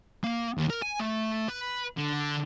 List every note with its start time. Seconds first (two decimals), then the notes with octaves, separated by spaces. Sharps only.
0.24 A#3
0.58 D#2
0.70 A#4
0.82 G#5
1.00 A3
1.48 B4
1.98 D3